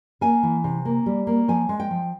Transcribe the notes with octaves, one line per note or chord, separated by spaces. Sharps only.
A#3 G#5
E3
C3
A#3
G3
A#3
F3 G#5
G#3
G5
F3